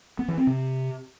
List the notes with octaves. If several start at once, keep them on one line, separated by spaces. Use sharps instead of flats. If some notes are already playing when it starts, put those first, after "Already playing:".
B3
E3
C4
C3